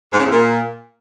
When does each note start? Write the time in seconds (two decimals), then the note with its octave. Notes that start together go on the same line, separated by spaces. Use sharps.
0.13 G#2
0.19 C#3
0.25 E2
0.31 A#2